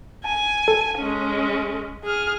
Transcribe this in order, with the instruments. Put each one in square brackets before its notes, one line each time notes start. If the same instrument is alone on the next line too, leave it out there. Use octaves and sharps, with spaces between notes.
[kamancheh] G#5
[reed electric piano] A4
[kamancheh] G#3 C#4
G#4 F6